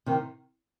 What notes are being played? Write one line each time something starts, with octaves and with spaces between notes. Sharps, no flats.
C3 D#3